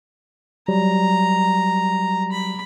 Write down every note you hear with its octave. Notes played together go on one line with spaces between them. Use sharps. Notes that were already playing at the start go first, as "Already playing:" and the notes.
F#3 G3 A#5
B5